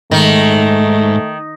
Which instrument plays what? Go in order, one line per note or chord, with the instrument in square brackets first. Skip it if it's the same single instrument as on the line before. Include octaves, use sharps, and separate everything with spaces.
[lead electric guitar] G#2 [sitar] D#3 [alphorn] A3